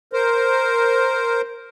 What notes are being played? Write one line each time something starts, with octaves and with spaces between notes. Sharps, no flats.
A#4 C5